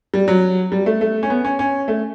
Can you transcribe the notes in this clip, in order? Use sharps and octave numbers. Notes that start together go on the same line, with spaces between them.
G3
F#3
G3
A3
A3
C#4
B3
C#4
C#4
A3